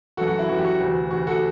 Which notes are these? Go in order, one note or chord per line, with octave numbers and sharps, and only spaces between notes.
F#2 E3 F#4 A4
F#4
E4
F#2 E3 F#4
G4
F#4
D2 C3 E3
D2 C3 E3 F#4
F#4 A4